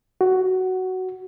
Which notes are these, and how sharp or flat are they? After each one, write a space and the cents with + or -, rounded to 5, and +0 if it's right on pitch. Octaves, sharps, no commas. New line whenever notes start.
F#4 +10